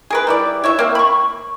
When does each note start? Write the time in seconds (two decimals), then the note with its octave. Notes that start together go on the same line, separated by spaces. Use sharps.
0.10 G#4 A#4 B4
0.27 G3 E4 D5
0.64 E4 C#5 E5
0.79 A#3 C4
0.95 B5 C#6